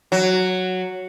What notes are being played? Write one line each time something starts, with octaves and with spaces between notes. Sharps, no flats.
F#3